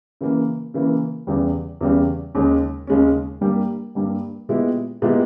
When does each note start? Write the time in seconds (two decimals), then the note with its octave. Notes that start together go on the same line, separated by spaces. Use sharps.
0.21 C#3 E3 A#3
0.74 C#3 E3 A#3
1.27 E2 C#3 G3
1.81 E2 C#3 G3
2.35 D#2 C#3 G#3 C#4
2.87 D#2 C#3 G#3 C#4
3.41 G2 G3 A#3
3.95 G2 G3 A#3
4.49 A#2 G#3 B3 E4 G4
5.02 A#2 G#3 B3 E4 G4